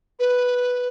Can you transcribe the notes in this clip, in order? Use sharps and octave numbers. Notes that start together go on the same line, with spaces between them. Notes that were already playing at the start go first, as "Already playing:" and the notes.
B4